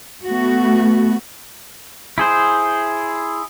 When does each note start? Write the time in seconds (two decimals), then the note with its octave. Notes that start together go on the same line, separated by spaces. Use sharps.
0.25 A3 B3 F#4
2.18 E4 G#4 C5